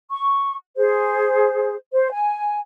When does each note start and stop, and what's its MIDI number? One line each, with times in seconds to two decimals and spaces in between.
0.10 0.56 85
0.78 1.75 68
0.78 1.75 72
1.94 2.12 72
2.12 2.60 80